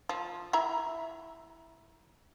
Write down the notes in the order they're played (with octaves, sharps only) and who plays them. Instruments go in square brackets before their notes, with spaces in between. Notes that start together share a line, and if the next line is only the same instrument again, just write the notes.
[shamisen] F3
E4 E5 A#5